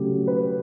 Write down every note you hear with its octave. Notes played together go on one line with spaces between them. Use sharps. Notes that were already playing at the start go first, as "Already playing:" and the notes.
Already playing: C#3 F#3 A3 G4
B4